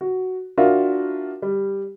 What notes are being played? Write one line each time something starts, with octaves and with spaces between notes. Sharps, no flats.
F#4
D4 F4 F#4 A#4 E5
G3